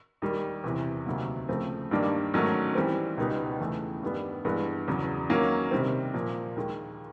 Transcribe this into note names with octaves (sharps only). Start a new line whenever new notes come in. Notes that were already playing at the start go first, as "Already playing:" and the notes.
D#2 D#3 G3
E2 C3 E3
D2 C3 D#3 F#3 A#3
C#3 F3 A3 C4
G2 D#3 G3 A#3 D4
G#2 D#3 F#3 A3 C#4
E3 G3 C4
C#2 B2 G3 B3 D#4
E2 C#3 E3 A3
G2 D#3 G3 B3
G2 E3 G#3 B3
E2 C#3 F#3
D#3 F#3 A#3 C#4
C3 D#3 G3 C4
A#2 F3 A#3
D#2 D#3 G#3